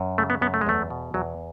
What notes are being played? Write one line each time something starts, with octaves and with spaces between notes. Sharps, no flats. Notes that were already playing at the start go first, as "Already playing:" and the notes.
Already playing: F#2
C#3 A3
B3
F#2 B3
A3
G#3
E2 A3
B2
E2 F#3